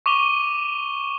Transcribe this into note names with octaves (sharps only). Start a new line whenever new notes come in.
C#6 D6 D#7 F7 G7